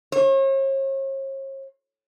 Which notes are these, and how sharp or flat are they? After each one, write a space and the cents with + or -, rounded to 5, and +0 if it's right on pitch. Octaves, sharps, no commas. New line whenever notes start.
C#5 -45